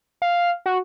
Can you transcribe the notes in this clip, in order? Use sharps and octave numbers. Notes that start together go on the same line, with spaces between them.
F5
F#4